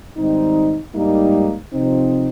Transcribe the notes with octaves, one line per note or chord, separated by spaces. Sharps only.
G#2 D#3 G3 C4 D#4
G#2 G3 A#3 D#4
C3 F3 C4 D#4